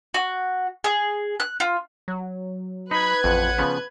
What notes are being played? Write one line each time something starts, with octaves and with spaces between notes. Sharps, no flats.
F#4
G#4
F#6
F4
F#3
D#4 B4 B5 F#6 G#6
A1 F2 F#5
C#3 F3 B3